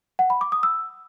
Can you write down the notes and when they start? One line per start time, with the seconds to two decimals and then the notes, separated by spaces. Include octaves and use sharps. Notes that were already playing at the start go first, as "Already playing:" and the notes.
0.19 F#5
0.30 B5
0.41 D6
0.52 D#6
0.63 E6